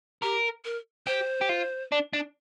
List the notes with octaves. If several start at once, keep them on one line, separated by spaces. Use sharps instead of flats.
G4 A#4
A#4
G4 C5
G4
F4
D4
D4